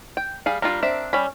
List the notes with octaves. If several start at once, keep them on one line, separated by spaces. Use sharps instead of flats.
G5
G3 G#4 F5
G3 D4 F4 A#4
C4 D4 E5
G3 C#4 B5